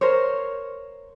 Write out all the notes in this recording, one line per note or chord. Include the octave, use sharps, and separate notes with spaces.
A#4 C5 C#5